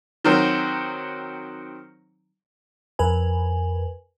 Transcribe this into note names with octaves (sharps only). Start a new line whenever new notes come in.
D#3 F#3 C4
F2 A#4 B4 G#5